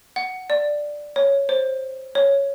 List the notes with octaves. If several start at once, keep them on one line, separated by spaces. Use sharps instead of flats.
F#5
D5
C#5
C5
C#5